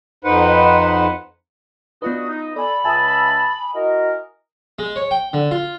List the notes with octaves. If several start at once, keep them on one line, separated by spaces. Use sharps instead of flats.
F2 D#4 B4 C5 F#5
B3 D4 D#4 F4 F#4 B4 D#6
D#4
A4 D5 G#5 B5
C#2 E5 G#5 A5 D#6
E4 F#4 A#4 D#5
G#3
C#5
G5
D3
F4